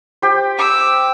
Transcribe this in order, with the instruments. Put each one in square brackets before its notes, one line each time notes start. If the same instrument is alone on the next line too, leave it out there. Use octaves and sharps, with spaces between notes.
[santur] G4 C5
[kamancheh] D6 E6